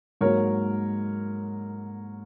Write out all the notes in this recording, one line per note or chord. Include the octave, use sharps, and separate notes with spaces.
G#2 F#3 A#3 A#4 C#5